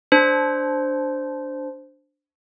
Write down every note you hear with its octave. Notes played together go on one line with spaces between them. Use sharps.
D4 C5